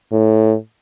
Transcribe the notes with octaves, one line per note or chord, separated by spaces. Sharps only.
A2